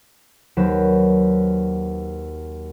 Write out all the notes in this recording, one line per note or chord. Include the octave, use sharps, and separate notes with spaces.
D#2 F#3 B4 C5 A#6 E7